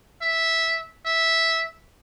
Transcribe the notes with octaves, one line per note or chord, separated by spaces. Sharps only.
E5
E5